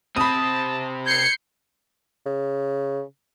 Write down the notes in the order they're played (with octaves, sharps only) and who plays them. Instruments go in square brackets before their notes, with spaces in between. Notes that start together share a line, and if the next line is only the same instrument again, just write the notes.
[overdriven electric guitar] C3 C4 [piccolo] A5 [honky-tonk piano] B5 D#6
[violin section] G6 C7 C#7 [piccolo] G#6
[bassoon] C#3